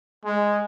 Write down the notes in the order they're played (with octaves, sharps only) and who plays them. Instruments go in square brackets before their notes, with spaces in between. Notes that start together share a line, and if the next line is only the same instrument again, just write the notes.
[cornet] G#3